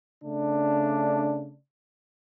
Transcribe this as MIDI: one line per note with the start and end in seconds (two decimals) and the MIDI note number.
0.24 1.58 49
0.24 1.58 57
0.24 1.58 62